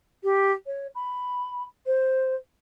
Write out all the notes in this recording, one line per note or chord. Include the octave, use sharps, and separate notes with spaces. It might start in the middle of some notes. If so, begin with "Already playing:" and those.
G4
C#5
B5
C5